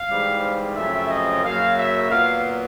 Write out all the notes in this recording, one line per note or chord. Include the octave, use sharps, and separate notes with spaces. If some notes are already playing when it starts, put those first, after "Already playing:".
Already playing: F5
G#2 E3 G3 C4
F#2 C#3 F3 A3 C4 E5
D#5
F#2 C#3 F#3 A#3 F5
E5
A#2 F#3 B3 F5